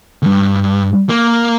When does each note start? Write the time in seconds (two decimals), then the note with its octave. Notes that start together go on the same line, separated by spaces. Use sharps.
0.22 D2 G2
1.09 A#3